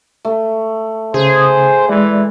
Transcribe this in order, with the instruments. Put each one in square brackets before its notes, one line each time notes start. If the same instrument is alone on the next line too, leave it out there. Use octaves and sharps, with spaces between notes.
[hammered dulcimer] A3
[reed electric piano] C#3 [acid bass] G#4 [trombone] C5
[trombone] E3 [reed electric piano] G#3 D5